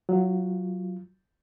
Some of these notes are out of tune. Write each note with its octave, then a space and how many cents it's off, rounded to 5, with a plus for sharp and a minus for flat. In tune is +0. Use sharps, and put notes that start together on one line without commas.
F#3 +0 F4 -15